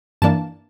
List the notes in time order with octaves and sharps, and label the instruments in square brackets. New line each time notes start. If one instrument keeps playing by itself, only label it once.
[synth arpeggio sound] G2 E3 A#3 D4 A5